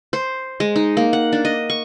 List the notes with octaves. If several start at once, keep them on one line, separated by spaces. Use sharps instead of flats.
C5
G#3
D#4
A#3
F#5
D4
D#5
C#6